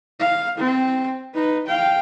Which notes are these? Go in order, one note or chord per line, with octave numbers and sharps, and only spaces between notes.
F5
C4
D#4 B4
F5 G5